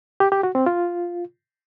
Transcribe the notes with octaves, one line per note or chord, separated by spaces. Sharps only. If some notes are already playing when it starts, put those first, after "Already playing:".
G4
G4
F#4
C4
F4